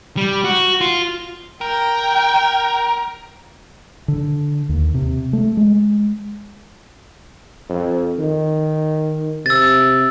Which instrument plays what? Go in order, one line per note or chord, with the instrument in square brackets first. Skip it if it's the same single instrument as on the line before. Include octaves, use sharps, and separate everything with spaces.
[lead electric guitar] G3
F#4
F4
[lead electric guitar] A#4 [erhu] G5
[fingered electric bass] D3
D#2
C3
A3
G#3
[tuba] F2
D#3
[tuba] C3 [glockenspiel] E6 A6